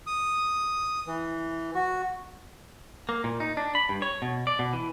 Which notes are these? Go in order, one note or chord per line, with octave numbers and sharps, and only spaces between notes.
D#6
E3
F#4
A#3
A#2
D#4
D4
B5
G2
C#5
B2
D5
B2
E3